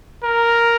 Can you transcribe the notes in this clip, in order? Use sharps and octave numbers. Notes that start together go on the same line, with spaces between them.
A#4